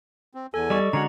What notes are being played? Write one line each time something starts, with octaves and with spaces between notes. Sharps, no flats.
C4
E2 A4 G#5
G3 D5 D#5 C#6
D3 G#3 C#4 F#4 C#5 A#5